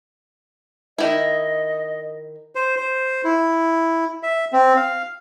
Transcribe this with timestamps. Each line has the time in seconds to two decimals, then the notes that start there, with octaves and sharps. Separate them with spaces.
0.98 D#3 E4 D#5
2.55 C5
2.76 C5
3.25 E4
4.23 E5
4.53 C4
4.76 F5